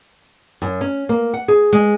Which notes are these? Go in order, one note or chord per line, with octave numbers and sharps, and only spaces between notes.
F#2
C#4
A#3
F#5
G#4
G#3